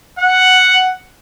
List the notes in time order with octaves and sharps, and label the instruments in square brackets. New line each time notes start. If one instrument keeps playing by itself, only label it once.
[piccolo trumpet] F#5